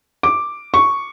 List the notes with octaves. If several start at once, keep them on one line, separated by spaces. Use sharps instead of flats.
D6
C#6